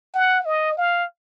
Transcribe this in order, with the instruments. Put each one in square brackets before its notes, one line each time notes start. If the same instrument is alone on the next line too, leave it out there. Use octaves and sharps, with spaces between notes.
[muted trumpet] F#5
D#5
F5